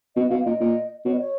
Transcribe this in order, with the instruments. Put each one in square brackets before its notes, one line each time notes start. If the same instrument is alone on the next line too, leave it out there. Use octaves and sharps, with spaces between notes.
[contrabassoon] B2 [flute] D#5
[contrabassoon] B2 [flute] F5
[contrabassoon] A#2 [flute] D#5
[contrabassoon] A#2
[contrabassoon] B2 [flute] C#5
[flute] D#5
C#5